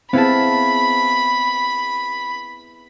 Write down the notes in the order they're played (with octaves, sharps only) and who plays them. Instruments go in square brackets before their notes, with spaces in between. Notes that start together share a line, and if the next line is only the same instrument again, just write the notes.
[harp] B3 E4 G#4 [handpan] C4 [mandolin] F5 A5 [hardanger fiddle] B5